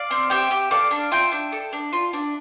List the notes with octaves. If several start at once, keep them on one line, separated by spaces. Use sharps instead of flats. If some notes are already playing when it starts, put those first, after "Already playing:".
Already playing: D5 F5
C4
G4 E5 G5
G4
A4 D5 F5
D4
F4 E5 G5
D4
A4
D4
F4
D4